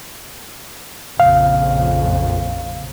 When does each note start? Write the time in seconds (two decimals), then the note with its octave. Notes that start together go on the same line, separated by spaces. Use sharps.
1.20 A#1 F2 C#3 F5